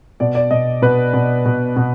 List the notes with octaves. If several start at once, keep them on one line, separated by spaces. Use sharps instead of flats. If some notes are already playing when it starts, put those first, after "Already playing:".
B2 D5
D5
B2 D#5
B2 B4
B2
B2
B2